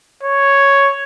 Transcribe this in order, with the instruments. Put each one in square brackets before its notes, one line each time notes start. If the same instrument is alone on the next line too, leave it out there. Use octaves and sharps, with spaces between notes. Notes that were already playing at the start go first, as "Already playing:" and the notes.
[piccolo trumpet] C#5